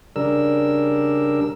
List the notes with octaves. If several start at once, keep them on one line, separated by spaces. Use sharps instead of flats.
C#3 G3 D4 A#4 E6